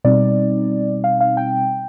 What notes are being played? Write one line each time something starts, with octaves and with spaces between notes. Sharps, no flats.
B2 G3 C4 D#4 D5
F5
F5
G5